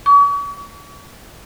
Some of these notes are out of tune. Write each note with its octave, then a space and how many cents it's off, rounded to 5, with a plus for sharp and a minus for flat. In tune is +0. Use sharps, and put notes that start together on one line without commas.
C#6 +45